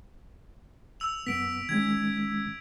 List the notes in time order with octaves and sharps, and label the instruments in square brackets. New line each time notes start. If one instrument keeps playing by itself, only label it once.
[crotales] E6 F7
[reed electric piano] F#2 B3 [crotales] B6 D7
[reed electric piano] D#3 G#3 C#4 [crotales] G#6